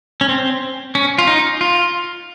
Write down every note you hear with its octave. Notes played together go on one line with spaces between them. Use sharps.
C#4
C4
C#4
F4
D#4
F4